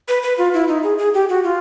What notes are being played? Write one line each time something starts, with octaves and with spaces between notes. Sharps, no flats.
B4
B4
F4
E4
D#4
G#4
G#4
G4
F#4
F4